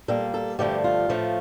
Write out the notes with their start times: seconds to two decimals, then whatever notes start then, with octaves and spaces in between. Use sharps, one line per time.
0.08 A#2 G3 A#3 A4
0.34 A4
0.59 G2 D3 F3 A3 G4
0.84 F4
1.09 A2 F3 A3